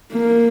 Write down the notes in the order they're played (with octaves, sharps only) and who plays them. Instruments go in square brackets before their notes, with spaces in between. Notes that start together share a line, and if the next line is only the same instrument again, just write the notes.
[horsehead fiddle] A#3